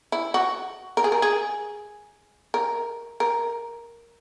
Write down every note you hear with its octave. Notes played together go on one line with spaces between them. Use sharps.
E4
F#4
A#4
G#4
A#4
G#4
A#4
A#4